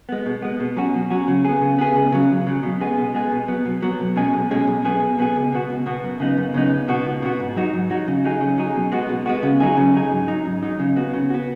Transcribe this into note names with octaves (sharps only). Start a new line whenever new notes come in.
G#3 B3
B2
G#3 B3
B2
F#3 C#4 F#4
B2
F#3 C#4 F#4
C#3
B3 G#4
C#3
B3 G#4
C#2
C#3 F#3
C#2
C#3 F#3
B2
G#3 B3 G#4
B2
G#3 B3 G#4
B2
F#3 B3
B2
F#3 B3
B1
B2 G#3 C#4 G#4
B1
B2 G#3 C#4 G#4
B1
B2 B3 G#4
B1
B2 B3 G#4
C#2
B2 B3 F#4
C#2
B2 B3 F#4
F#2
C#3 B3 D#4
F#2
C#3 B3 D#4
C#2
B2 B3 F#4
C#2
B2 B3 F#4
G#2
F#3 D#4 F#4
G#2
F#3 D#4 F#4
C#3
F#3 D#4 G#4
C#3
F#3 D#4 G#4
B2
G#3 B3 F#4
B2
G#3 B3 F#4
C#3
F#3 D#4 G#4
C#3
F#3 D#4 G#4
G#2
F#3 D#4
G#2
F#3 D#4
C#3
B3 F#4
C#3
B3 F#4